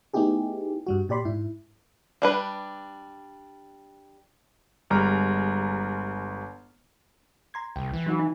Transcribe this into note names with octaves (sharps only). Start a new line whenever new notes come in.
A3 B3 D#4 E4 G4 G#4
G2 G3 F#4
A#2 G4 D5 B5 C6
G#2 E4
G3 D4 B4
G1 G3 G#3 A#5 F6
A#5 C6 G#6
C2 G5
E3
F#3 D#4 F#4
D#4